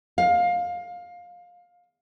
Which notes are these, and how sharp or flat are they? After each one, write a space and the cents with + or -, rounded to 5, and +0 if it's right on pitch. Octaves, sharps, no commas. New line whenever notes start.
F5 +20